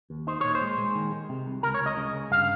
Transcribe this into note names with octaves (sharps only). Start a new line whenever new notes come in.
D#2
D#4 C5
A#2 C#5
C5
G#3
G#3
D#3
G#3
C3
C2
C#2 A#4
C#5
C#2
D#5
C#3
C#2
G2 F5